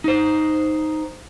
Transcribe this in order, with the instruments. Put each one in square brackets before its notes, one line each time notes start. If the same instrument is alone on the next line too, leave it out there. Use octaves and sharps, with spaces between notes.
[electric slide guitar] D#4 C5